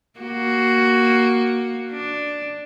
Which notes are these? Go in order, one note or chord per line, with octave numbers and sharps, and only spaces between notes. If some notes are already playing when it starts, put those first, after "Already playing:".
A#3 F#4
D4